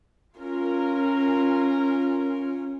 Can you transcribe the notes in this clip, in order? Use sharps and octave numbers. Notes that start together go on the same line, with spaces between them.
C#4 F4 A#4